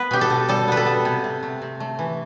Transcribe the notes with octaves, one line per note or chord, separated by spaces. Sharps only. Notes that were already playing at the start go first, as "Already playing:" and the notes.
Already playing: B3 B4
B2 G4
A4
B2
G3 A4
B3 B4
A4
B3
C3
C3
A3
C3
A3
E3